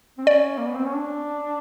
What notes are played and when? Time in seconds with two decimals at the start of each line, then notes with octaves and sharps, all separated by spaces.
0.18 C4
0.26 C#4 D5
0.58 A#3
0.67 B3
0.76 C4
0.85 C#4
0.94 D4